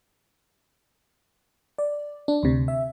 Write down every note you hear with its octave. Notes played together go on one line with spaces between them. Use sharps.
D5
D4
D2 C3
E5